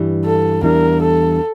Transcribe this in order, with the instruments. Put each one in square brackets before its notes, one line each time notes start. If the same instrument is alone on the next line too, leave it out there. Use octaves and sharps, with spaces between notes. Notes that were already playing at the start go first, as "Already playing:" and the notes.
Already playing: [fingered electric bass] G2 E3 G3
[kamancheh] A4
[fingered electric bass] E2 E3 G3 D4 [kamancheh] A#4
[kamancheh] A4